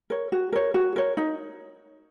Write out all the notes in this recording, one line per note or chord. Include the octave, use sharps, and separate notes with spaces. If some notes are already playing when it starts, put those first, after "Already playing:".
A#4 C#5
F#4
A#4 C#5
F#4
A#4 C#5
D#4